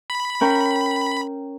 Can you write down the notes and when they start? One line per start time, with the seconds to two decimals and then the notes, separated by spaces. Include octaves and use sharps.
0.10 B5
0.41 C#4 A#4 G5